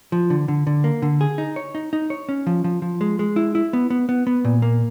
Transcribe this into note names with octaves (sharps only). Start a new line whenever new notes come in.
F3
D3
D3
D3
A#3
D3
G#4
D#4
C#5
D#4
D#4
C#5
C#4
F3
F3
F3
G#3
G#3
E4
E4
B3
B3
B3
B3
A#2
A#3